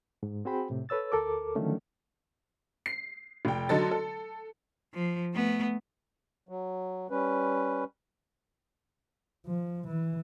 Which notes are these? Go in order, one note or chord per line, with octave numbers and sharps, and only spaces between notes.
G#2
C4 F#4 G#4 C5 G5 B5
A2 C3
A4 B4 C#5 E6 A6
D2 A4 A#4 D6
D3 D#3 F3 F#3 A3 C#4
C7
F1 G5
D3 F#3 D#4 A4 A6
A4
F3
A3 B3
F#3
G3 C#4 B4
F3
E3